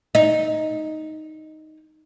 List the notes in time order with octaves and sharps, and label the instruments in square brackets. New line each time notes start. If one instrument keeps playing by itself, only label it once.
[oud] D#4